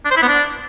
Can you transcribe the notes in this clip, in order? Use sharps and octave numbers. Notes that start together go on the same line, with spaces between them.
D4
C5
E4
B3
D4